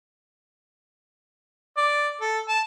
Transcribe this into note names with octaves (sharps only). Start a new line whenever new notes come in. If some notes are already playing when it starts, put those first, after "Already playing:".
D5
A4
A5